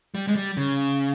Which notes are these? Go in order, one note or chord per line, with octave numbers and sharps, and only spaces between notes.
G3
G#3
G3
C#3